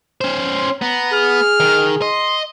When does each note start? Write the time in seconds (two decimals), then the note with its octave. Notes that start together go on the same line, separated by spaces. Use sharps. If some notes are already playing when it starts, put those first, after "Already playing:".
0.21 C#4 C5
0.53 C6
0.82 B3 A#5
1.13 G#4 F6
1.60 D#3
2.02 D#5 C6